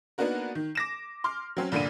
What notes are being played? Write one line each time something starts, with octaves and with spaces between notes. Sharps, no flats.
A#3 B3 D4 D#4 F#4 A#4
D#3
D6 A#6 E7
C6 D6 F6
F#3 C4 C#4
C2 G2 A#2 D3 D4 D#7